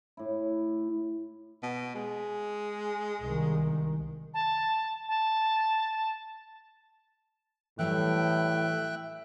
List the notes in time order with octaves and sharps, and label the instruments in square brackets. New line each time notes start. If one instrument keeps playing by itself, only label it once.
[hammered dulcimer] A2 E4
[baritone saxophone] B2
G#3
[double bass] C2 D#3
[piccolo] A5
A5
[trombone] A2 [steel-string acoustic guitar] E3 F#3 G3 [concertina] E5 G5 F#6